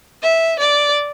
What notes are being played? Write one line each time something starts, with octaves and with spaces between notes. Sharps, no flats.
E5
D5